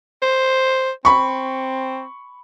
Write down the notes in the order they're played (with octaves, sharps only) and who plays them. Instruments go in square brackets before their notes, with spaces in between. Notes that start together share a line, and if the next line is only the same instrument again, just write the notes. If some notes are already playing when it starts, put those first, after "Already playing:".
[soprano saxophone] C5
[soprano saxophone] C4 [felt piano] B5 C#6